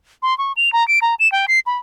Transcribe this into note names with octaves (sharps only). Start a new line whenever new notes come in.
C6
C#6
F7
A#5
D7
A#5
E7
G5
C7
B5